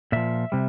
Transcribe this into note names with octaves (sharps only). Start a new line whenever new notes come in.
A#2 F3 E5
C3 G3